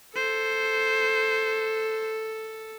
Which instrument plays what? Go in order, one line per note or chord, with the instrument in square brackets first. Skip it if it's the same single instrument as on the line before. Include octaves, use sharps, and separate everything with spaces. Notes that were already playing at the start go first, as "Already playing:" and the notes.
[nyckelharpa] A4 [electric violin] C5